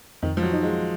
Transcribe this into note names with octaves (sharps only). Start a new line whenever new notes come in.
F2 D#3
F3
F#3
D#4
G#3